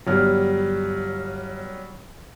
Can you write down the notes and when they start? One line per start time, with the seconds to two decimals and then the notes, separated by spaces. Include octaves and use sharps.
0.06 G1 F#3 G3 F6